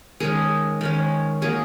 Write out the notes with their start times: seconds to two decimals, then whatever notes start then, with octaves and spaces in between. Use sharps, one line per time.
0.20 D#3 G#3 C#4 G#4
0.81 D#3 G#3 C#4
1.42 D#3 F#3 A#3 C#4 G#4